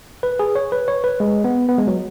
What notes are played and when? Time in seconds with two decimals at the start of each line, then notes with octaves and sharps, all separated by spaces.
0.23 B4
0.39 G#4
0.55 C#5
0.72 B4
0.88 C#5
1.04 B4
1.20 G#3
1.44 B3
1.69 B3
1.78 G#3
1.87 F#3